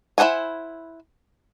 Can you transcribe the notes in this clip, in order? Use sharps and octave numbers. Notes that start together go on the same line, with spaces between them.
E4 G#4 C5 F#5 G#5